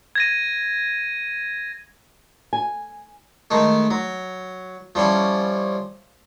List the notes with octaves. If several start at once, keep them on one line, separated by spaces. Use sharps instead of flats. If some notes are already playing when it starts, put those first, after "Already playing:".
G#6 A#6 D#7
G#5
D#3 G#3 A3
F#3
F3 G3 C#4 E4